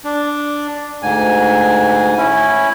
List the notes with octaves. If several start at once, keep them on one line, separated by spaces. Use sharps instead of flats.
D4
D2 G#2 G#5
C#4 E4